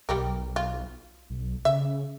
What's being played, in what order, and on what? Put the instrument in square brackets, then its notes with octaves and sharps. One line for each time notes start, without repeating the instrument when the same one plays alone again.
[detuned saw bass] B1 [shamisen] G3 G4 A#4
[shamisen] F4
[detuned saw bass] B1
[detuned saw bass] C#3 [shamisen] E5